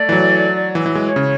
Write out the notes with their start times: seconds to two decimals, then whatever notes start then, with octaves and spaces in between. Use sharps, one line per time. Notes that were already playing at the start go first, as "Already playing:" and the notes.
Already playing: A3 D5
0.09 E3
0.12 F#3
0.75 E3
0.86 E3
0.95 G#3
1.06 C#5
1.16 C#3